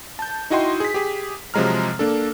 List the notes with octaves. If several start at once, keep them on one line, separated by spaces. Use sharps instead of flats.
A5 G6
D#4 E4 F#4 D#5 G5 C6
G#4 B6
G4 G#4
C3 F3 F#3 G#3 A#5 F6
A#3 D4 A4